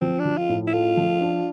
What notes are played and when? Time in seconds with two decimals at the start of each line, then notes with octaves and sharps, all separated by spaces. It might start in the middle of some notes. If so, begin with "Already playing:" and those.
0.02 F3 C4
0.20 D4
0.26 F3
0.38 F4
0.49 A2
0.67 E4
0.73 A3 F4
0.97 F3
1.21 D4